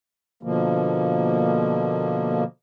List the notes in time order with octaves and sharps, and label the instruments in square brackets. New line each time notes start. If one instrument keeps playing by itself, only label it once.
[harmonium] B2 D3 F3 A#3